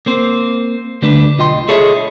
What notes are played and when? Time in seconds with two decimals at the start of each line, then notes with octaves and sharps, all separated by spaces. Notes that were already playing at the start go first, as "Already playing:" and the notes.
0.06 A#3 C4 C5
1.02 D3 G3 A3 D4 B4
1.38 B1 F4 D#5 G5 C6
1.68 E4 G#4 A4 C#5 D#5 E5